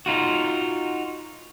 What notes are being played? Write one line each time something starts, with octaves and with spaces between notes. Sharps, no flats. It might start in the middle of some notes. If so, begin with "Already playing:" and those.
D#4 F4 F#4